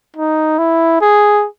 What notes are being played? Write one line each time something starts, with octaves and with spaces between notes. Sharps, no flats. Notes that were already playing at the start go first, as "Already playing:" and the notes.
D#4
E4
G#4